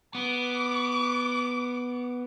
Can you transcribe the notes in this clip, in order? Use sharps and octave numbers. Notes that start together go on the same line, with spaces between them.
B3 D6